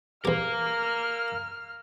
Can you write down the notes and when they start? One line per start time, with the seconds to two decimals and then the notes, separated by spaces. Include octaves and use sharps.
0.25 E2 G4 A#4 F5 F6